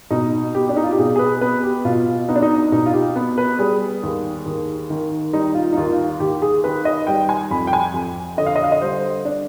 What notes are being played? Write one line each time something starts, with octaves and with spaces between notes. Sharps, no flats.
B2 D#4
B3 G4
D4
D#4
F4
G4
B2 G#4
G#4
B4
B3 B4
G4
B2 F4
B3 D#4
D4
D#4
B2 D#4
F4
G4
B3
B4
G3 G#4
D#2
D#2
D#3
G3 D#4
F4
D#4
D#2 F4
D#2 G4
G#4
D#3 B4
D#5
G3 G5
G#5
F2 B5
G5
G#5
F2
D3 D#5
F5
D#5
F5
D#5
G3 C5
D4